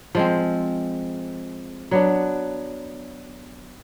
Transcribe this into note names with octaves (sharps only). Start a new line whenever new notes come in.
F3 G#3 C4
F#3 B3 D4